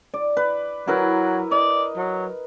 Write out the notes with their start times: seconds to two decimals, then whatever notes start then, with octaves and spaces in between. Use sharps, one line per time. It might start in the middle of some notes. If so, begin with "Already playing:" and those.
0.14 D5
0.37 B4
0.87 F#3 E4 A#4 B4
1.51 D5 D#5
1.97 F#3